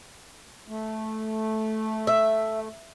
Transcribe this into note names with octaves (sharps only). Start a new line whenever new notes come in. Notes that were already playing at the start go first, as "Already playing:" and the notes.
A3
E5